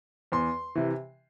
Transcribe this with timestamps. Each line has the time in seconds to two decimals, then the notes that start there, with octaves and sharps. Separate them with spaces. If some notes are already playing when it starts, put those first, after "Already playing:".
0.32 E2 C6
0.75 C3 E3